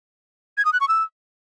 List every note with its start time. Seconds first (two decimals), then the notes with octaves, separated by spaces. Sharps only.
0.58 G#6
0.65 D#6
0.73 F#6
0.81 C#6
0.88 E6